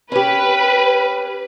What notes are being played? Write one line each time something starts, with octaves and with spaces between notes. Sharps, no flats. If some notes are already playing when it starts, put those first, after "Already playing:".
C#4 G4 B4